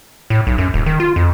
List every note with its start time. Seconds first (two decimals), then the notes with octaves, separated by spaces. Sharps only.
0.30 A2
0.47 B1
0.58 F#2
0.74 D#1
0.86 D#3
1.00 F4
1.16 F2